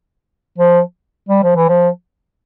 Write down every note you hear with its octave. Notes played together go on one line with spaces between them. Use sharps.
F3
G3
F3
E3
F3